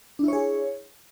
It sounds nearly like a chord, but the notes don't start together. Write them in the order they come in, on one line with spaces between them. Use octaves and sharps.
D4 E4 C#5 G#4